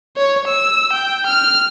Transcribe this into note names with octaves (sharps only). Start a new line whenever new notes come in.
C#5
E6
G5
F6